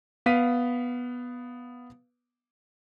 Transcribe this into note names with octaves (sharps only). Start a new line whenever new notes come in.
B3 F5 B6 D#7